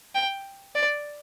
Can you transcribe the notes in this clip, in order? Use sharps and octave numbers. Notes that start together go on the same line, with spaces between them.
G5
D5